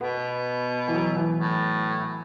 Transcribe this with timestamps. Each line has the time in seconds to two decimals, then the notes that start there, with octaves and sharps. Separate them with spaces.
0.01 B2 B3
0.88 E3
0.94 F#3
1.17 E3
1.40 A2